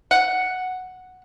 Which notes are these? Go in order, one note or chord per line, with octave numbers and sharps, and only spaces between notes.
F#5